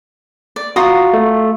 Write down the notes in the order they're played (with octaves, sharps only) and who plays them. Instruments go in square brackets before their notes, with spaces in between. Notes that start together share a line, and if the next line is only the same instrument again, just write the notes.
[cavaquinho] D5
[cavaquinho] F4 A#5 D#6 [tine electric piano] F#4
[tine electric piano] A3